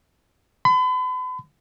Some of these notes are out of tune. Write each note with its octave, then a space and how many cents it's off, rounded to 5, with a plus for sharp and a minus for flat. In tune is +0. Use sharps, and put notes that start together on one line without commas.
B5 +40